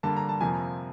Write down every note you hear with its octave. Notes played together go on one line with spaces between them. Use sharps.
G2 D3 G3 A#3 A5
A#5
A5
F2 C3 F3 A#3 G#5